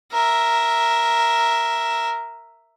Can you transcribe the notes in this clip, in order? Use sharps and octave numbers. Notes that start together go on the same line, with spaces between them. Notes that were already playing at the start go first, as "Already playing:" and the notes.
A#4 E5